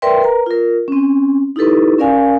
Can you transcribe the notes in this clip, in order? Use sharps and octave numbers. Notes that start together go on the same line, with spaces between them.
A#4 B4 D5 E5 G5 C6
A#4 B4 A#5
F4 A#4
C4 C#4
D#4 E4 G4 A4 B4
C#4 A#4 D5 F5 G#5